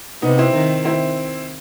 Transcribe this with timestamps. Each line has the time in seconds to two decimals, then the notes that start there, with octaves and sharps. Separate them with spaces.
0.22 C3 B3 D#4
0.38 C4 E4
0.54 D#3
0.85 C4 E4